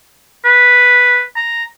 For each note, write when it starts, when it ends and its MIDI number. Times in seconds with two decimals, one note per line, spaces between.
0.45 1.22 71
1.36 1.64 82